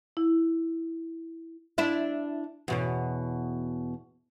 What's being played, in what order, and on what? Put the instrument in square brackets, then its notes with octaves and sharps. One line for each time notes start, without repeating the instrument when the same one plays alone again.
[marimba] E4
[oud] D4 E4 E5
E2 B2 C#4